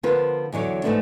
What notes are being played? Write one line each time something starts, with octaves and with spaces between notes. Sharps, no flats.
D3 F3 B3 F4 A#4 B4
E2 D3 F#3 C#5
G#2 B2 F3 A3 B3 D4